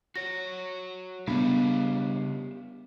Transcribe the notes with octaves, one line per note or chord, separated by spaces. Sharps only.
F#4 C#5 A#6
C#3 G3 B3 D4 G4 E5 F5